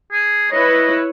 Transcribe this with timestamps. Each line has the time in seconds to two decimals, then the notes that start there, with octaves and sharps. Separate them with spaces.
0.12 G#4
0.51 E4 B4 C#5 D#5